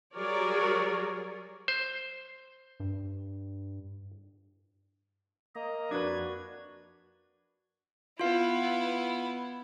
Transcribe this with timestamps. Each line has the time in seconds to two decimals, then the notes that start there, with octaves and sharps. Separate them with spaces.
0.14 F#3 G3 G#4 A#4 C#5 D5
1.68 C5
2.80 G2
5.55 A#3 D#5 A#5
5.91 F2 D4 F#4 B4 G#6
8.19 B3 E4 F4 F5